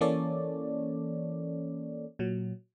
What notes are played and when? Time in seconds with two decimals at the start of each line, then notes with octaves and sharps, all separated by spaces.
0.01 E3 A#3 C#4 A4 C#5 D5
2.19 A#2 F#3